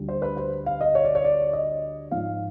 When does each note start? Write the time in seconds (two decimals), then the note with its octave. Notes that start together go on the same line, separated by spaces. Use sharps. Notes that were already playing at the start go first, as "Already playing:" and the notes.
Already playing: D2 D3 G3
0.09 C5
0.22 B4
0.37 C5
0.66 F5
0.81 D#5
0.95 C#5
1.05 D5
1.15 C#5
1.24 D5
1.53 D#5
2.11 G#2 F3 F5